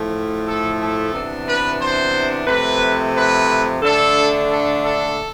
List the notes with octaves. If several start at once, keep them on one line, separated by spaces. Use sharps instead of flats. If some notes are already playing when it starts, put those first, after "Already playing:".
Already playing: A2 F3 A3
A4
A4
C3 E3 B3 D4
B4
C5
C3 F3 A3 B4
B4
D3 A3 D4 A4
A4
A4